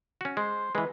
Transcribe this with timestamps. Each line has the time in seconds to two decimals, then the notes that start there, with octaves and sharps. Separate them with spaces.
0.21 C#4 F#4
0.37 G#3 C5
0.75 E3 G#3 B3